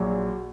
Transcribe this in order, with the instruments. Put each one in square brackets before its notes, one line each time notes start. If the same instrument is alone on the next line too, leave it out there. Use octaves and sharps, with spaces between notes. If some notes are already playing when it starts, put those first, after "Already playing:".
Already playing: [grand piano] A#1 A#2 F#3